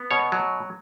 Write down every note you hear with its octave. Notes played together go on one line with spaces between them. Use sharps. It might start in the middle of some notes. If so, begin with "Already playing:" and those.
Already playing: B3
B2 C#5
F#3